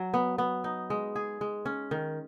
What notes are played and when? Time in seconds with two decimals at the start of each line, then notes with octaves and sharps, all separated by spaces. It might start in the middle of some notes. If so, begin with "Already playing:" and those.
Already playing: F#3
0.14 B3
0.38 B3
0.64 D#4
0.90 G#3
1.16 G#4
1.41 G#3
1.66 C#4
1.91 D#3